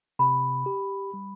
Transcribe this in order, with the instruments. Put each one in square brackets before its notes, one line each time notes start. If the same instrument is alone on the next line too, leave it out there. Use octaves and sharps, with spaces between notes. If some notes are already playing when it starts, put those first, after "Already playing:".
[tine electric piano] C3 [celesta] B5
[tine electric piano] G4
G3